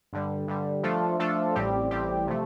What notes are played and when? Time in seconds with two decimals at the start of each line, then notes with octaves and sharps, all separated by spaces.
0.13 G2 D3 G3
0.48 G2 D3 G3
0.83 F3 A3 D4 F4 A4
1.19 F3 A3 D4 F4 A4
1.55 A1 A2 G3 C4 G4
1.91 A1 A2 G3 C4 G4
2.27 C3 F3 A3